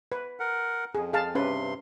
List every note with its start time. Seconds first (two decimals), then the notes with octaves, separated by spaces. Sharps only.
0.12 B4
0.40 A#4 F#5
0.95 F2 G#4
1.13 G#4 F5 A5
1.35 G2 C3 C#4 B4 C6